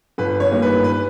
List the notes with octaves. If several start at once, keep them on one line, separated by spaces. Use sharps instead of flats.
G1 B4
C#5
G2 D#3 A#3
B4
B4